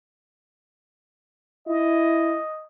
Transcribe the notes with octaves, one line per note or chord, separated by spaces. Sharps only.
E4 D#5